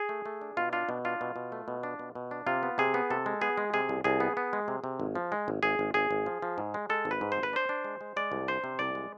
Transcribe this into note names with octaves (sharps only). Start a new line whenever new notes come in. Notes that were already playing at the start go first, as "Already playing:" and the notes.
Already playing: G#4
A3
A3
D4
B2 F4
D4 F4
B2
D4 F4
B2
B2
A3
B2
D4
B2
B2
D4
C3 F4
B3
C3 G#4
B3
C3 A4
G#3
B3 G#4
G#3
C3 G#4
C2
C2 G#4
B3
B3
G#3
C3
C3
G#1
F3
G#3
G#1
G#1 G#4
G#1
G#1 G#4
G#1
F3
F3
G#2
G#3
G#3 A4
G#1
B4
G#2
C5
G#1
B4
D4 C5
D4
G#3
G#3
G#3 D5
C2
D4 C5
C3
C2 D5
G#3